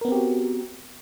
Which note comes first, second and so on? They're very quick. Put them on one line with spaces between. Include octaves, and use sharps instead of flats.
A#4 B3 C4 G4 F#4